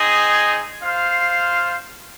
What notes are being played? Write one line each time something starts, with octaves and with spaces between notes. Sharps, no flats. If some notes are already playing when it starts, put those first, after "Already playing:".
Already playing: C4 D#4 G#4
F4 C5 F5